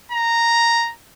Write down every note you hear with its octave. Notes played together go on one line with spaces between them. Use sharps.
A#5